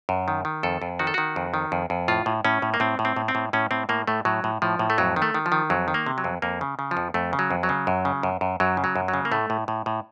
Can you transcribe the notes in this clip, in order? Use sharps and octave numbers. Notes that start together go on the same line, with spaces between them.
F#2
D#3
D#3
F2 A4
F2
D#3 F#4
A4
D#3 F#4
F2
D#3
F2
F2
A2 F4
A2
A2 C#4
A2
A#3
A2 C4
A2
C4
A2
C4
A2
A2 C#4
A2 C4
A2 A#3
A2 A3
A2 F#3
A2
A2 F3
A2
A3
F2 F#3
D#3
A3
D#3
F3
D#3
F2 F#3
D#3
A#3
C3
F#3
F2
F2 A#3
C#3
C#3
F3
F2
F2 A3
C#3
F#3
F2
F#3
C#3
F#2
C#3
F#2
F#2
F#2 F#3
C#3
F#3
F#2
F#3
C#3
A#3
A2 A3
A2
A2
A2